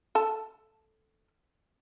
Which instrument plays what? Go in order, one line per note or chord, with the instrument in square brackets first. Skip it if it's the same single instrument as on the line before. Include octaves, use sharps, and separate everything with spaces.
[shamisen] A4 A5